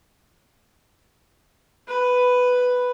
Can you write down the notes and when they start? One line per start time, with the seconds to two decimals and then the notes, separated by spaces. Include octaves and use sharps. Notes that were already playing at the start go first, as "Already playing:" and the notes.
1.88 B4